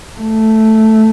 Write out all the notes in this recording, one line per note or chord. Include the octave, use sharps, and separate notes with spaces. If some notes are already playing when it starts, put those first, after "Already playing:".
A3